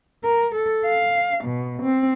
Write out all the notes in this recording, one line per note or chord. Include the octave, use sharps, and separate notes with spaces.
A#4
A4
F5
B2
C4